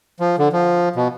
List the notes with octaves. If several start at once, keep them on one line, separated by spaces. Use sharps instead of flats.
F3
D3
F3
B2